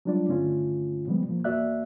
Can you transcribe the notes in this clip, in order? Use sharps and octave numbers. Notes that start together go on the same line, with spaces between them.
F#3 G3 D4 F4 D5
G2 D3 D#3 A3 C#4 F4
A#2 F3 G3 G#3 B3
A#2 F3 A#3
E2 A#3 F#4 D5 E5 F#6